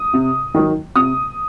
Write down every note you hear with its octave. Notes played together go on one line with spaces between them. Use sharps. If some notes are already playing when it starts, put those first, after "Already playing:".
Already playing: D#6
C3
D#3 F#3
C3 D#6